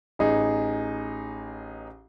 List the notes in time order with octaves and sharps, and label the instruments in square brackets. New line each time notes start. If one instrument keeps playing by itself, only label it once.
[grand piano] A1 D#4 G#4